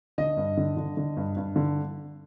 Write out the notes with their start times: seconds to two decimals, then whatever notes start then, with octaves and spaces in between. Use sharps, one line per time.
0.18 D3 D#5
0.37 G2
0.57 D3
0.77 D3
0.97 D3
1.17 G2
1.37 G2
1.56 D3